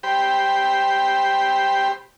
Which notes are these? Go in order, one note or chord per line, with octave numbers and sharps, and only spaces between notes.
G4 C5 G5 B5